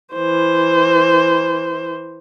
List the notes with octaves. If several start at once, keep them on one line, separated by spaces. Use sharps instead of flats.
E3 C5